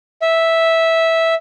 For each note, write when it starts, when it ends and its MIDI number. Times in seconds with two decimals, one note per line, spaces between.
0.22 1.34 76